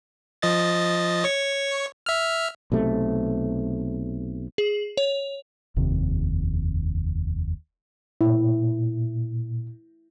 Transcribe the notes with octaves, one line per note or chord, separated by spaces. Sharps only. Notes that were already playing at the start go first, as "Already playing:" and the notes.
F3 D#5 A6
C#5 C#6
E5 F6
B1 C3 A3
G#4
C#5
F1 D#2 C3
A#2 E4